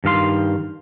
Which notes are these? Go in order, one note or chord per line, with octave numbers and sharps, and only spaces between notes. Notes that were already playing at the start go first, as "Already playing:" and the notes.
G2 D#3 F5 C6